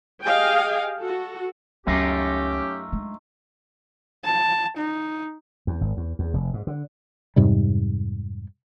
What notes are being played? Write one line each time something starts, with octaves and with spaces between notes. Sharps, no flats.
G4 G#4 D#5 F5 G5 G#5
F#4 A4
C#2 F#2 A3 B3 C#4 D#4 F4 G4
G#3 D4
A5
D#4
E2
G#1
E2
E2
F1
G#2
D3
F2 G#2 C3 G3